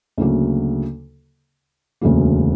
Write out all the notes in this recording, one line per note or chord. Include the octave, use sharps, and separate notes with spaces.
D2 C#3 F#3 A#3
E1 D2 C#3 F#3 A#3